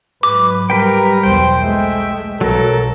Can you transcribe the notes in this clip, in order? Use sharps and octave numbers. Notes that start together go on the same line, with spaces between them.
G#2 F#3 B4 D6
G3 A#4 B4 G5
B1 E2 C5 G5
G#3 A3 E5
B1 F#3 A4 A#4